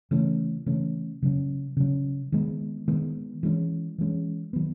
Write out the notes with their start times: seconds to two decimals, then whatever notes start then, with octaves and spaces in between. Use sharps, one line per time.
0.11 C#3 E3 A3 C#4
0.66 C#3 E3 A3 C#4
1.22 C#3 F#3 C#4
1.77 C#3 F#3 C#4
2.32 D#3 G#3 B3
2.88 D#3 G#3 B3
3.43 E3 G#3 C#4
3.98 E3 G#3 C#4
4.53 D#3 F#3 B3